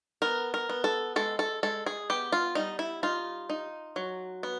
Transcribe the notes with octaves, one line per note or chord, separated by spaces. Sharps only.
B3 A#4
A#4
B3
A4
G#3 A4
A4
G#3 A4
G#4
B3 G4
F4
G3 D#4
E4
D#4 F4
D#4
F#3
B3